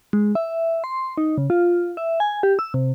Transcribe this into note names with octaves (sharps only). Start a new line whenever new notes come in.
G#3
E5
C6
D#4
C#3
F4
E5
G#5
G4
E6
C3